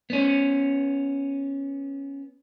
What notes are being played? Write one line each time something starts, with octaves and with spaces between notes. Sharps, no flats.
B3 C#4